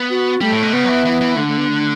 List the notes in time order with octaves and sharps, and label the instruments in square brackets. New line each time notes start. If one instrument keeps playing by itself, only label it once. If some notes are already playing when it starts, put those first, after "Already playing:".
Already playing: [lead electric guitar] B3
[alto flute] F#4
[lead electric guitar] G3 [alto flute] A3
[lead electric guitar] A2
B2
[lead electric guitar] C#3 [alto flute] B3
[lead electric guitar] F#3
E3
E3
E3
[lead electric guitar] D3 [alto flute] A3
[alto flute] A3
B3
A3